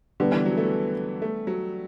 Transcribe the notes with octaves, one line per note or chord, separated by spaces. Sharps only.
D3 G3 B3 D4
E3
F#3
A3
A3
F#3